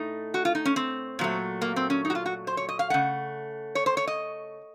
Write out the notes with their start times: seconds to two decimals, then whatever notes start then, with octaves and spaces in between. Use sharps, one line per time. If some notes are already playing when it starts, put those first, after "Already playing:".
Already playing: A2 A3 D#4
0.34 F#4
0.45 F4
0.55 D#4
0.65 C#4
0.76 C4
1.19 A#2 F#3 A3
1.61 A#3
1.76 C4
1.90 C#4
2.05 D#4
2.10 F#4
2.15 F4
2.26 F#4
2.47 C5
2.57 C#5
2.69 D#5
2.79 F5
2.90 C#3 A3 F#5
3.75 C#5
3.86 C5
3.97 C#5
4.07 D#5